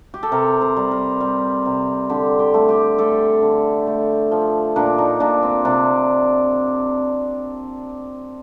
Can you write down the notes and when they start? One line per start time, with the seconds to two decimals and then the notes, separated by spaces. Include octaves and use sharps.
0.14 G4
0.23 A4
0.32 C3 A#4
0.61 C5
0.76 G3
0.91 A#4
1.21 G3
1.65 C3
2.09 D3 G4
2.39 G4
2.54 A3
2.69 G4
2.98 A3 A4
3.42 D3
3.87 A3
4.31 F3
4.76 A#2 D4
4.98 D#4
5.20 A#2 D4
5.43 C4
5.65 C3 D4